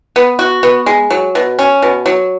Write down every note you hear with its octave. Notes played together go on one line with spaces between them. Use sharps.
B3
F#4
B3
G#3
F#3
B2
C#4
B2
F#3